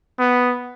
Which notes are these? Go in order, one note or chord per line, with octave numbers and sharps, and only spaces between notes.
B3